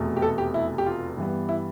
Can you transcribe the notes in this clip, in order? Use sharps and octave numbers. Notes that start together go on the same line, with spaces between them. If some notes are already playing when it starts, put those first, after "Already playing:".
Already playing: F1 E2 B2 A3
G4
A4
G4
E4
G4
F4
G2 E3 G3 B3
E4